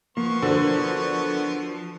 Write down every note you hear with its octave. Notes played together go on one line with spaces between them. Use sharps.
F3 A#3 B3 C#6
D3 F#4 A#4 C5